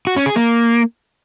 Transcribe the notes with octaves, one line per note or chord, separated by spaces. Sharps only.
F#4
C#4
G#4
A#3